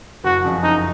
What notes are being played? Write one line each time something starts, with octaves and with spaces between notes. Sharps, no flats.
F#1 F#4
F2 C#3 F3
F#1 D#4